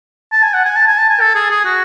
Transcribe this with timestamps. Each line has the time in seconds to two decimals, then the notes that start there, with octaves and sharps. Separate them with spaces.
0.32 A5
0.43 G#5
0.54 F#5
0.65 G#5
0.76 A5
0.88 G#5
0.98 A5
1.10 G#5
1.21 A4
1.35 G#4
1.50 G#4
1.65 F#4